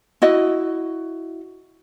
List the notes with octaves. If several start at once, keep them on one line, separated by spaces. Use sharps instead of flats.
E4 F#4 D#5